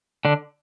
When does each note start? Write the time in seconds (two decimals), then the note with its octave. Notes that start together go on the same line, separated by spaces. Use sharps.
0.25 D3 D4